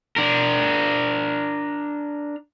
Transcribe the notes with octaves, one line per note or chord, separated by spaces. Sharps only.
D4 A#4